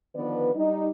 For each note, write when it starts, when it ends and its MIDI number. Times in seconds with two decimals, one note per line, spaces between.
0.15 0.50 50
0.15 0.50 51
0.15 0.50 53
0.15 0.50 59
0.15 0.50 71
0.15 0.50 74
0.54 0.89 55
0.54 0.89 63